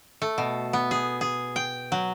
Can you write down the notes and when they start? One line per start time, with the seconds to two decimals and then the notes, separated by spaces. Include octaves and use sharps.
0.22 A3
0.38 B2
0.73 B3
0.91 G#4
1.21 G#4
1.56 G5
1.92 F#3